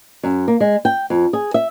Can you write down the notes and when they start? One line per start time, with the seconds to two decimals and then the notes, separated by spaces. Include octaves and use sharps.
0.23 F#2
0.48 A#3
0.60 G#3
0.85 G5
1.10 F2
1.33 G#4
1.54 E5